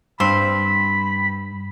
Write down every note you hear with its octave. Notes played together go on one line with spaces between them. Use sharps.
G2 C4 B5 C6